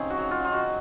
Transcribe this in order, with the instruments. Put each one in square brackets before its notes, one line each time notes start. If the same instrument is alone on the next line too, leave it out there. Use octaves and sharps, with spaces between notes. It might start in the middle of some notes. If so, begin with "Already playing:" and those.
Already playing: [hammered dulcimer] C#3 C4 D#4 G#4
F#4
F#3
F4
D#4 F4
F#4